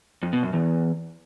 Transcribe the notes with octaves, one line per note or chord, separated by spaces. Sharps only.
F2
B2
F#2
E2